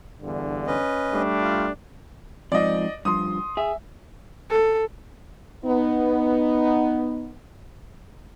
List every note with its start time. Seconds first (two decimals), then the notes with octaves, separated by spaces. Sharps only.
0.23 E2 G2 D3
0.67 C#4 B4 D#5
1.12 G3 A3 D4
1.41 F4
2.52 F2 G#2 F3 D5 D#5
3.05 G2 F3 C6 D#6
3.57 G#4 E5
4.50 A4
5.65 B3 D#4